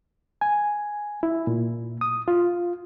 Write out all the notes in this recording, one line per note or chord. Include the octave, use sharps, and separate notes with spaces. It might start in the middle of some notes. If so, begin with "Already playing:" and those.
G#5
E4
A#2
D#6
F4